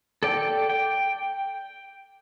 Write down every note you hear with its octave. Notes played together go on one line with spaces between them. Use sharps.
A4 D5 G5
G5